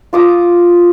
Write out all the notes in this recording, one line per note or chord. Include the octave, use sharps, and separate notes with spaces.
F4 D6 D#6